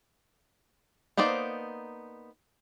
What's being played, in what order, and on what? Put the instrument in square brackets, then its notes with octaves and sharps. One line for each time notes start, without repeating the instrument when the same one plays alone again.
[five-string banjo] A#3 B3 D#4 C5 D5